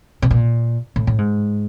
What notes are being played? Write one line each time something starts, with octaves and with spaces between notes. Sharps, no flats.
B2
A#2
A2
A2
G#2